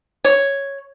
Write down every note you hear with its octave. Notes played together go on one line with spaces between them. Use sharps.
C#5